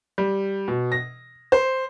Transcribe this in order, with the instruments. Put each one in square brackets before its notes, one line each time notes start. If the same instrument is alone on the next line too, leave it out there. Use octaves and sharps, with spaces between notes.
[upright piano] G3
B2
A#6
C5